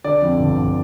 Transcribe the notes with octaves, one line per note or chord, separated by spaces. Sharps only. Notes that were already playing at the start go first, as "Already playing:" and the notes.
D3 D5
F2
G1
G1